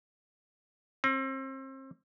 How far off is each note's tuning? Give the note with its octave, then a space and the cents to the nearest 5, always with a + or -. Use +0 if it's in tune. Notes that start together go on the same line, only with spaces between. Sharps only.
C4 +35